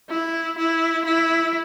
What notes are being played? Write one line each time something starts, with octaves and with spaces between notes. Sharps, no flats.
E4
E4
E4